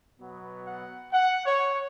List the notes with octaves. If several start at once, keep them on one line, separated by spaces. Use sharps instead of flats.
B2 F#3 B3
F#5
F#5
C#5